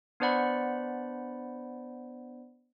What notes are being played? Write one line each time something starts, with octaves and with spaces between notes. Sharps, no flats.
B3 D4 C5 D5 F#5 B5